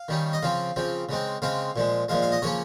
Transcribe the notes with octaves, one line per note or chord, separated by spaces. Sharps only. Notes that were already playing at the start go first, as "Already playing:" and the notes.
Already playing: F5
D#3 G3 C#4
D#5
C#3 F3 C4 F5
C#3 F3 C4
C#3 G#3 C4
C#3 G#3 C4 F5
A#2 F3 G#3
A#2 F3 G#3 F5
F5
D#5
C#3 F3 A#3 C#4 C#5